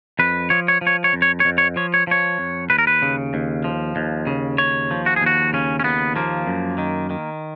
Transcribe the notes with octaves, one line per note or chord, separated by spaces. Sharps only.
F2 B4
F3 C#5
C#5
F3
C#5
C#5
F2
C#5
C#5
F2
C#5
F3 C#5
C#5
F3 C#5
F2
D#2 B4
A#4
B4
C#3
D#2
F3
D#2
C#3
D#2 C#5
F3
F#4
G#4
D#2 F#4
C#3 C#4
C#4
D#2 B3
F3 A#3
F#2
D#3
D#3